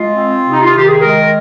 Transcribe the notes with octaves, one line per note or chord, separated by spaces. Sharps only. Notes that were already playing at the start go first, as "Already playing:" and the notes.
Already playing: G#3 F4
C4
C3
D#4
F4
D#3 G4
G#4
G#3 A#4